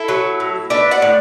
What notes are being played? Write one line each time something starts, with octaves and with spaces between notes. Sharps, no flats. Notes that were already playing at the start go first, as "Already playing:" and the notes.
Already playing: E4 A4
F#3
A2
D4 B4 E5
D5 F#5
A2